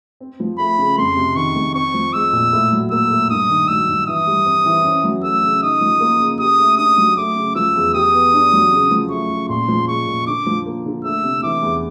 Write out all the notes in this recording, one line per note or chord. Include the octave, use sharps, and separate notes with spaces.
C4
F3
A3 B5
C#3
F2 C6
C3
D#3 C#6
F2
C4 C#6
F3
G#3 E6
A#2
A2
F#3
A#3 E6
A2
G2 D#6
D#3
F#3 E6
G2
E3 D#6
G3
C4
E3
C#4
F#3
A3 E6
C#3
D#4 D#6
F3
A#3
C#3
G4 D#6
A3
D4 D#6
F#3
A3 D6
C#3
F3 E6
E2
G4 D#6
B3
D4
F#3
C#3
F3
A3 C#6
C#3
A#2 C6
F3
G#3 C#6
A#2
D3 D6
F3
A#3
D3
A3 E6
C3
E3 D6
E2